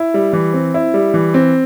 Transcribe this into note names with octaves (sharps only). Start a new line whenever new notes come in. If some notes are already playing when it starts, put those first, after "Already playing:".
Already playing: E4
G3
E3
C4
E4
G3
E3
C4